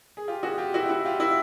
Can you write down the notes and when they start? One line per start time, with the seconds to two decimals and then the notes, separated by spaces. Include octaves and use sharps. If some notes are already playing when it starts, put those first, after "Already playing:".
0.17 G#4
0.28 F4 G4
0.43 F#4 G#4
0.58 F4 G4
0.74 E4 F#4
0.83 G4
0.89 E4 F#4
1.05 F4 G4
1.20 E4 F#4